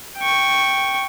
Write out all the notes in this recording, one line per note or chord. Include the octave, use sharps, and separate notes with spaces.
G5 C#6